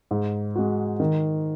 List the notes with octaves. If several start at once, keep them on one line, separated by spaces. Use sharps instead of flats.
G#2
G#3 F#4
D#3